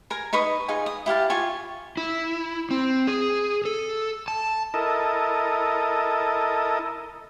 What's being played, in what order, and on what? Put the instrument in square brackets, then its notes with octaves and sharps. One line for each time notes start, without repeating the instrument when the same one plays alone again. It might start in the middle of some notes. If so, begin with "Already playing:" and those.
[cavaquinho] A#4 G#5 A#5
D#4 B4 C#6 D#6
D#4 F4 G#4 G#5
D#6
E4 G4 F5 A5
F4 G4 G#5 C#6
[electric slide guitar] E4
C4
G#4
A4
A5
[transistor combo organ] E4 A4 A#4 D#5